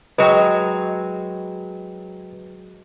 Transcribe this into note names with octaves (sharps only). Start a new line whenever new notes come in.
F#3 G#3 B4 G5